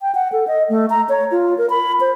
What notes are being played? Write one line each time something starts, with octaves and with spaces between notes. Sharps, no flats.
G5
F#5
A4
D#5
A3
A#5
C#5
F4
A#4
B5
C5